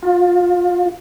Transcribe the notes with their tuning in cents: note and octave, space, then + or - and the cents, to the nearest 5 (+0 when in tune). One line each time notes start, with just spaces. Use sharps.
F4 +25